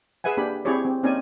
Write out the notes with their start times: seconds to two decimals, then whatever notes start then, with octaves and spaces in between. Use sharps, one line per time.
0.24 G#4 B4 E5 F#5 G#5
0.37 A#3 D4 G4 B5
0.65 C4 E4 G4 G#4 C#5 D5
0.85 C4
1.03 A#3 C4 C#4 D#4 D5 G#5